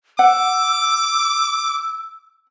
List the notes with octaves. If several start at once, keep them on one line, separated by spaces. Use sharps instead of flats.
F#5 D6 E6